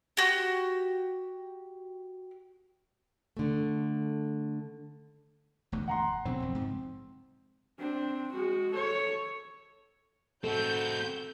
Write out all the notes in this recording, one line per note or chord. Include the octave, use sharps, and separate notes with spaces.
F#4 G4
D3 A3
E1 D2 G2
F#5 A#5 C6
B2 D3 F#3 C4
A#1 E2
G#2 C#3 F3
C4 D4
G#3 F#4
A4 C#5
C4 F#4 A4 G6